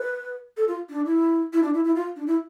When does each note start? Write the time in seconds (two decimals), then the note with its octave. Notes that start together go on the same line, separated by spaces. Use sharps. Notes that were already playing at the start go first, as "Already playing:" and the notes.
Already playing: B4
0.57 A4
0.68 F4
0.90 D4
1.06 E4
1.53 E4
1.63 D4
1.74 E4
1.85 E4
1.96 F4
2.16 D4
2.27 E4